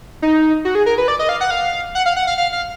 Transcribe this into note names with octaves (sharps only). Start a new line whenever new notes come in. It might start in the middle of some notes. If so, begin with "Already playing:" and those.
D#4
F#4
G#4
A#4
B4
D5
D#5
F5
F#5
F5
F#5
F5
F#5
F5
F5
F5